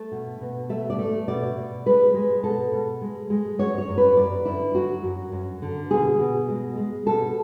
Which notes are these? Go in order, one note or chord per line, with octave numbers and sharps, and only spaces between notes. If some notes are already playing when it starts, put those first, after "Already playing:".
Already playing: A3
B2
B2
A3 E5
D5
A3
B2 D5
B2
G#3 B4
G#3
B2 A4
B2
G#3
G#3
F#3 C#5
C#5
F#2
B4
F#2 D5
D3 E4
F#3 F#4
F#2
F#2
D3
B2 G#4
B2
G#3
G#3
B2 A4